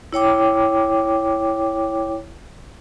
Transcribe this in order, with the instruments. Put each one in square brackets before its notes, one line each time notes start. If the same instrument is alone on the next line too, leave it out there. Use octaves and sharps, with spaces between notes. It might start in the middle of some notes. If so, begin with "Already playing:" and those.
[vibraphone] E4 C#5 G5 D6